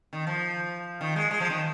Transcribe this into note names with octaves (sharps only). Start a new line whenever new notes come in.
D#3
F3
D#3
G#3
G#3
F3
D#3